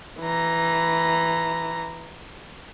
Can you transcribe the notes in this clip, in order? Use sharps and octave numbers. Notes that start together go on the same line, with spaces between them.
E3 A#5